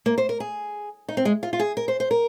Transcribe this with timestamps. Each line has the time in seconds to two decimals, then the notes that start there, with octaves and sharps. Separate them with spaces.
0.06 A#3
0.18 C5
0.29 A#4
0.40 G#4
1.08 D#4
1.17 C4
1.25 G#3
1.43 F4
1.53 F4
1.59 G#4
1.77 A#4
1.88 C5
2.00 C5
2.11 A#4